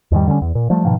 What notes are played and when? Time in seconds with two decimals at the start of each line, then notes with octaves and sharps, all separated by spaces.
0.11 E2 G#2 D#3 G3
0.28 D3 G3 G#3 C#4
0.42 E2
0.55 A#2
0.70 F3 G3 A3
0.85 G#2 B2 D#3 F3